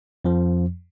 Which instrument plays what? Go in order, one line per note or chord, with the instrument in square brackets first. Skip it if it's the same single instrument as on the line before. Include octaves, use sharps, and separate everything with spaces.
[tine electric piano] F2 F3